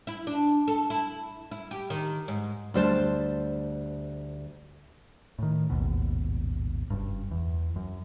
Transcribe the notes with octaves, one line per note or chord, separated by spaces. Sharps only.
E4
D4
A4
E4
E4
G4
D#3
G#2
D2 G3 C5 A5
A2 D#3
A1 D#2 G#2 B2
F#1 G2
E2
F#2